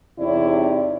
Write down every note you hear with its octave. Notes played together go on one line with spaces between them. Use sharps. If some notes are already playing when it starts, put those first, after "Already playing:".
E2 C3 D#4 E4 C#5 D5